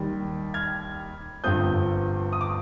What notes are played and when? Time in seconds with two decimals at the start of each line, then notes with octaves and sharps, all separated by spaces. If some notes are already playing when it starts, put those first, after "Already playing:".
Already playing: D#2 D#3 G3
0.54 F6 G#6
1.44 G1 G2 F3 C4 D#6 G6
2.33 D#6
2.41 D6